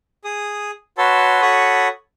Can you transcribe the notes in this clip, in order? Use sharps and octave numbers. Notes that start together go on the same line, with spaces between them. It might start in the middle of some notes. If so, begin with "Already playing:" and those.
G#4 D#6
F#4 B4 C#5 A5 C6 E6
F#4 A4 C#5 B5 C#6 D#6